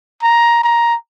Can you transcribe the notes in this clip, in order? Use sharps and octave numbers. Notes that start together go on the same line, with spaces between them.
A#5
A#5